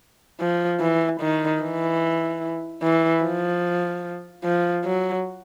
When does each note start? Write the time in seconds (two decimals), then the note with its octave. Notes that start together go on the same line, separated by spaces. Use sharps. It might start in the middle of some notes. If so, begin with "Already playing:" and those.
0.40 F3
0.81 E3
1.21 D#3
1.62 E3
2.82 E3
3.24 F3
4.44 F3
4.85 F#3